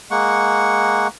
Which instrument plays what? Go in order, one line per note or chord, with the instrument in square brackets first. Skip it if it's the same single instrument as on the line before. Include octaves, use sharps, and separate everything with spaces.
[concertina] G#3 A#3 F#5 C#6